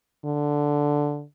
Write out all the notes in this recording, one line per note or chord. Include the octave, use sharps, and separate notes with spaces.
D3